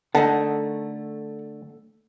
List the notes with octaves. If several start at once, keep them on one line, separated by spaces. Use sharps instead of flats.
D3 A3 D#4 A#4 F#5 A5